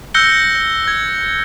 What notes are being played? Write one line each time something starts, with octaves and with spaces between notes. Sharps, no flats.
E6 F#6 G6 A#6 C#7 G7
G#6